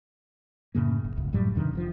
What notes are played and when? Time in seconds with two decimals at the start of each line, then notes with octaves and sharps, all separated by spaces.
0.75 F#2 A2 C#3 A#3
1.04 F#1
1.16 D1 G1 C#2
1.33 F#2 A2 F#3 G3
1.55 E2 G2 C3 D#3
1.73 F#1 C#3 F3